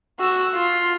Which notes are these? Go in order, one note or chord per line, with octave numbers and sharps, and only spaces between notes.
F#4 E6
F4